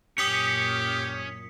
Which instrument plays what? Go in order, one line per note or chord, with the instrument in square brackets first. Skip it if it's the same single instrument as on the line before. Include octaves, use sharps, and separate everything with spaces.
[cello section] F#2 A#2 [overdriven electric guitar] C#4 [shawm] G4 [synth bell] D#6 B6 C#7